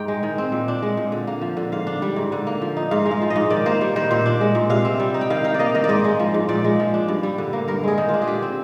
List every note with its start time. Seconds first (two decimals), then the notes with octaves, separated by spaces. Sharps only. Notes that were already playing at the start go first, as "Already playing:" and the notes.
Already playing: G#2 D#4 G5
0.08 G#3
0.23 D#3
0.38 C4
0.52 A#2
0.68 D4
0.82 G#3
0.97 A#2
1.12 D3
1.27 A#3
1.42 F3
1.57 D3
1.72 G#2 F5
1.87 D4
2.02 G3
2.16 G#2
2.32 D3
2.47 A#3
2.62 F3
2.77 D#4
2.91 G#2 F5
3.06 G#3
3.11 F5
3.22 F3
3.30 D#5
3.36 G#2
3.50 D#3 D5
3.66 A#3 C5
3.81 G3
3.96 D#3 C5
4.11 A#2 C5
4.26 D4
4.41 G#3
4.55 A#2
4.70 C3 F5
4.85 C4
5.00 G3
5.14 D#4
5.21 G5
5.30 D#3 F5
5.44 D#4 F5
5.54 D5
5.59 A#3 D#5
5.75 D#3 D#5
5.84 D5
5.89 G#2 D#5
6.04 G#3
6.20 F3
6.34 G#2
6.49 A#2 D5
6.64 G#3
6.80 F3
6.94 D4
7.08 G2
7.23 G3
7.38 D3
7.53 A#3
7.68 G2 A#4
7.83 G#3 G#4
7.98 D#3
8.09 F4
8.14 D4
8.22 G#4
8.27 D3 G4
8.42 C4